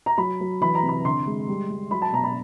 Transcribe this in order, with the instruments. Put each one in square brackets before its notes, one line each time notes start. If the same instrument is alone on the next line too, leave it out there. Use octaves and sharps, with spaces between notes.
[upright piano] A#5
F#3 B5
F#3
E3 B5
A#5
C3
B5
D3 C6
G#3
G3
G3
F#3 B5
A5
B2 A#5
B5